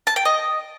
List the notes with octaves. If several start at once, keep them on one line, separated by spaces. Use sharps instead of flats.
A5
G5
D#5